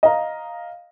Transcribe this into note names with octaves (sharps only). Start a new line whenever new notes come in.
D#5 F5 A#5